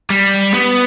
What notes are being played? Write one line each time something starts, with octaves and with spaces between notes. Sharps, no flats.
G3
B3